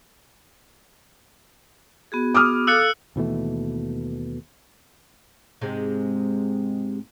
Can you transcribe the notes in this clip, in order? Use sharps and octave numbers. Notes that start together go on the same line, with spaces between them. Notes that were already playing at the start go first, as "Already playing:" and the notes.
B3 F#4 G#4
D6 D#6 F6
A4 F5 E6 F#6 C#7
D#2 B2 E3 A3
G#2 C3 G#3